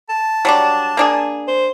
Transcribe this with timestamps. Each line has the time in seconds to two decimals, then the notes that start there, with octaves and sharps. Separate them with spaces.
0.09 A5
0.45 F#3 G3 D4
0.97 A#3 D4 G#4
1.48 C5